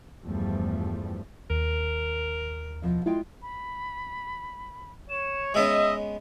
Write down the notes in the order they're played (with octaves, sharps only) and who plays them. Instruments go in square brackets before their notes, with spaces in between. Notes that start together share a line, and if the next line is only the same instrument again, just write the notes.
[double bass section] E2 G2 F3 G3 A3
[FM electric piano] D#2 [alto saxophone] A#4
[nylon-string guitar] B2 F3 E4
[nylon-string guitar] G#3 F4 G5 [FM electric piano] E4
[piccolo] B5
[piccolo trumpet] C#5 [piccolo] E7
[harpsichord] G#3 B3 C#4 [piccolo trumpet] D#5 [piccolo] E5